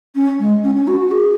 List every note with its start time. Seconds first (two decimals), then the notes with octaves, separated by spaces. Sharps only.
0.15 C#4
0.39 G#3
0.63 C#4
0.74 C#4
0.87 F#4
0.99 F#4
1.11 G#4